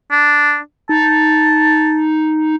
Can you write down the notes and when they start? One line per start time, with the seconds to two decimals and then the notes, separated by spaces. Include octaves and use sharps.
0.11 D4
0.89 D#4 A5